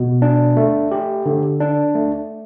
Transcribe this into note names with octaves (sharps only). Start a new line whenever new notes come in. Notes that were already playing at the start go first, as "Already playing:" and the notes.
Already playing: B2
D4
A3
G4
D3
D4
A3